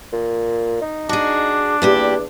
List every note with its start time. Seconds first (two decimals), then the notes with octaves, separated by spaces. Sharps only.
0.13 A#2
0.82 D#4
1.09 D4 F#4 G#4
1.82 E2 A#2 E4 G4